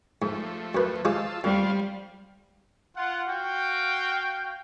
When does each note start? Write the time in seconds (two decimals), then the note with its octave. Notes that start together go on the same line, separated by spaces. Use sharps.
0.22 G#2 F3 A3
0.75 F#2 B4
1.05 F3 G#3 F4 G#4 A5 E6
1.44 F2 G3 F4 C5 F5
2.96 F4 F#5
3.29 F#4 F5 G5